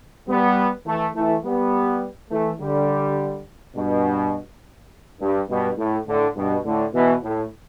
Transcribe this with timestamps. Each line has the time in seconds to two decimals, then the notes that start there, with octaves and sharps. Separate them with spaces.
0.29 G3 B3
0.86 E3 A3
1.15 E3 A3
1.44 G3 B3
2.31 E3 A3
2.60 D3 G3
3.76 G2 B2
5.21 G2
5.49 G2 B2
5.78 A2
6.08 A2 D3
6.36 G2 B2
6.65 A2 D3
6.94 B2 E3
7.23 A2